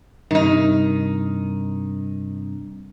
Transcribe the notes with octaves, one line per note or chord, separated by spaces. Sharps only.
G2 C3 D#3 D#4